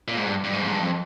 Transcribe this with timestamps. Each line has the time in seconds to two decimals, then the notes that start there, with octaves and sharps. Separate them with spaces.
0.08 A#2
0.17 G#2
0.26 G2
0.44 G2
0.53 G#2
0.62 F2
0.67 G#2
0.71 G2
0.79 F2